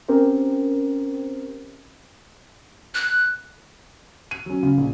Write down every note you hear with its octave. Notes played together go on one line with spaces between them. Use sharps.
C4 C#4 G4 A#4 C5
F#6
D#7
F#3 C#4
C#3
A#1